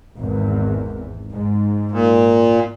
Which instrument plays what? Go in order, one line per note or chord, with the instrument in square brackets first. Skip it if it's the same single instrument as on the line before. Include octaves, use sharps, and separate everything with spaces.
[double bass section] G#1 E2
G#2
[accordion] A#2